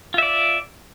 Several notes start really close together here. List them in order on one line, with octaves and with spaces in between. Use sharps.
F4 E5 D5